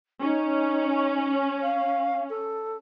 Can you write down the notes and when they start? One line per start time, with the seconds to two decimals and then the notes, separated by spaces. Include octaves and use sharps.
0.23 C#4 D#4
1.62 F5
2.30 A4